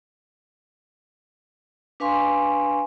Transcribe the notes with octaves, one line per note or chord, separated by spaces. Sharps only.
D4 B4 F5 G#5 C6 C#6